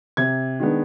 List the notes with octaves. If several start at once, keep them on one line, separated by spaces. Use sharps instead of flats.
C3 G#6
D#3 G#3 B3 D4